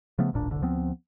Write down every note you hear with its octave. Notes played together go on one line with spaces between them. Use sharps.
C#3 F3 A3 B3
D#1 A1 A#2 D4
F#1 C2 D3
D2 F3 B3 C4